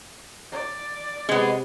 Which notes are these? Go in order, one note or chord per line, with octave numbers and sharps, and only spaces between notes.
D5
C3 G#3 B3